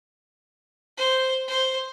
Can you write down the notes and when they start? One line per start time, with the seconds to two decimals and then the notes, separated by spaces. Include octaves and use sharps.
0.98 C5
1.48 C5